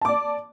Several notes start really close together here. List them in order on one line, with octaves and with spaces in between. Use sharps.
A5 D6 D5